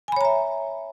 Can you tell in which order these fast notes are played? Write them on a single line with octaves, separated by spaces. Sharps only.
G#5 B5 C#5 A#5 E5